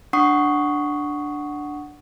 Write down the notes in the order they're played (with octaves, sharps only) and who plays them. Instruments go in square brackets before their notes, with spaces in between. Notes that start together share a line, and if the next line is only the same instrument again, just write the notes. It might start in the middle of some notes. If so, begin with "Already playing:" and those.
[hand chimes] D4 F#5 C#6 D#6 C7